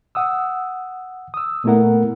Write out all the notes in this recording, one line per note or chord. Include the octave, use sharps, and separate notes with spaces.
F#5 D#6 E6
D#6 E6
A#2 A3 B3 E4 A#4 F#5